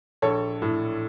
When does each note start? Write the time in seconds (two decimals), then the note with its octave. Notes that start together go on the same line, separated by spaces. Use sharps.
0.22 A#1 A4 C#5
0.62 A2